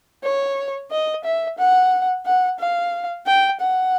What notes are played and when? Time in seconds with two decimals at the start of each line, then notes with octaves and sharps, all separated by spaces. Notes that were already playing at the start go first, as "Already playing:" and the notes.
0.24 C#5
0.91 D#5
1.25 E5
1.58 F#5
2.26 F#5
2.59 F5
3.26 G5
3.60 F#5